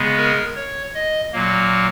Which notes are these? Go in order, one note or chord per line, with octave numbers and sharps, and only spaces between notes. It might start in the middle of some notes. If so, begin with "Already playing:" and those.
Already playing: C#3 G#3 B3
A#4
C#5
D#5
A#2 F#3 A#3